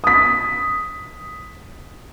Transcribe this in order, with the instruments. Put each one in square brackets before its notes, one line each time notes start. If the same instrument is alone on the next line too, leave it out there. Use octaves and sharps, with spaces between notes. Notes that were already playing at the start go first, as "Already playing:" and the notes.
[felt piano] D#6 B6